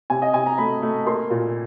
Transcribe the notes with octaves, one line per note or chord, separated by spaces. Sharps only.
C3 G#5
D#5
C3 G#5
A#5
A3 B5
A3
A#3 C6
A#2